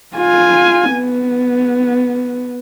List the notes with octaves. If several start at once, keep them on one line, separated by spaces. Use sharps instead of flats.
F4 G#5
B3